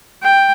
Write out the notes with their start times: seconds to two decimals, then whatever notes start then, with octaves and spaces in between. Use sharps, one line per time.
0.23 G5